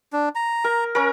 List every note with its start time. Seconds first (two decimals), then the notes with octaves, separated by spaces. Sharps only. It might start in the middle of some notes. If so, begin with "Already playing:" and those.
0.13 D4
0.35 A#5
0.64 A#4
0.95 C#4 A#4